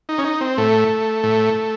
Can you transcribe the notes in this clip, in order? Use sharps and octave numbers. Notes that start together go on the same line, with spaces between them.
D#4
C#4
D#4
C4
A2 A3
A2